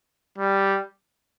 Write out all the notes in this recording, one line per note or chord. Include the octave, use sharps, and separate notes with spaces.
G3